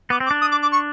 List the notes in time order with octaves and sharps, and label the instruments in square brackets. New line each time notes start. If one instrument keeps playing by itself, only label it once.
[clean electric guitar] B3 [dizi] D6
[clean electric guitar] C4
[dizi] D6
[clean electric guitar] D4
[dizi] D#6
D6
D6
C#6